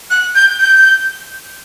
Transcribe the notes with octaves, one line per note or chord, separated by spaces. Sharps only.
F#6
G6
G6